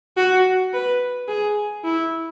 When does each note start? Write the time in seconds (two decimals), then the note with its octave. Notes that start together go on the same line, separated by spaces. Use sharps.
0.17 F#4
0.74 B4
1.29 G#4
1.84 E4